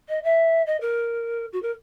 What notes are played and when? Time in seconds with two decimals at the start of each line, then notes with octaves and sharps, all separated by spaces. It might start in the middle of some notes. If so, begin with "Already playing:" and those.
0.09 D#5
0.24 E5
0.66 D#5
0.81 A#4
1.53 F#4
1.62 A#4